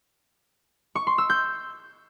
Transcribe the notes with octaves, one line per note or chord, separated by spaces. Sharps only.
C#6
C6
E6
G6